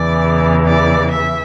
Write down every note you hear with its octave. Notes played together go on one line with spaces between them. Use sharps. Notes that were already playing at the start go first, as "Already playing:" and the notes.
Already playing: E2 C#3 E3 D5
D5
E5